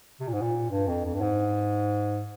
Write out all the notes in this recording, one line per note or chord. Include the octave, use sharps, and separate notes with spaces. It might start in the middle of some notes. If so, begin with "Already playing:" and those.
C3
A#2
G#2
A#2
G2
F2
F2
G2
G#2